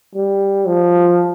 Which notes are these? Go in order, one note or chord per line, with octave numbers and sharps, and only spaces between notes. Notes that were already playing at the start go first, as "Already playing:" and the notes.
G3
F3